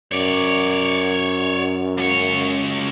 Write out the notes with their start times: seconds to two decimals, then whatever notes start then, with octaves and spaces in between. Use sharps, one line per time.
0.12 F#2 C#5 D5
1.98 C#2 C#5